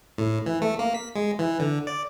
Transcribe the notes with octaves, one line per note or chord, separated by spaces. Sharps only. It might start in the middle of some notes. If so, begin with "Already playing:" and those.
A2
E3
A3
A#3
B6
G#3
E3
D3
D5